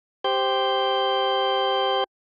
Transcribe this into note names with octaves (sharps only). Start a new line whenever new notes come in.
G4 C5 G6